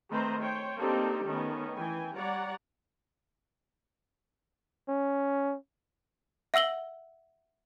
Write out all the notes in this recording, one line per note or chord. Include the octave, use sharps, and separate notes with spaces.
D#3 A3 C4 B4 C5 A#5
C5 C#5 G5
A#3 C4 D4 D#4 G4 A4
D#3 A3 B3 C#4
E3 G5 G#5
G3 C#5 D5 F#5 A#5
C#4
E5 F#5 E6 F#7 G7